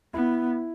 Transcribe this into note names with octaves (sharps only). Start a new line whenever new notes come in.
B3 E4